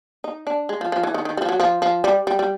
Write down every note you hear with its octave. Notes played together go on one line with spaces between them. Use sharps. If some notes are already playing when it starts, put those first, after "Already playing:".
D#4
D4
G#3
F3
F3
E3
D#3
D#3
G3
F3
F#3
F3
F3
G3
G3
G3